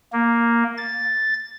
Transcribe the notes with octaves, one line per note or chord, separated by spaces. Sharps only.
A#3
A6